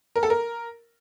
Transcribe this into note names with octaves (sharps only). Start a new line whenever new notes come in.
A#4
A4
A#4